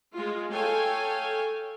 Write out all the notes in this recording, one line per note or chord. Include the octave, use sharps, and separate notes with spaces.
G#3 F4
A4 C#5 F5 G5 G#5